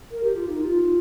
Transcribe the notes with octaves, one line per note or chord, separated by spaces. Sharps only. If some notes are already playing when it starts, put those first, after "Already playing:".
A#4
G4
F4
D#4
F4